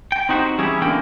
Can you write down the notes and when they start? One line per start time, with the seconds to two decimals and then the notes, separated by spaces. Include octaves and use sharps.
0.12 G5
0.29 C4 D#4 F#4 G4 C5 F#5
0.58 E3 G3 C#4 E4 G4 G#4
0.81 E2 D3 E3 A#3 C#4 G5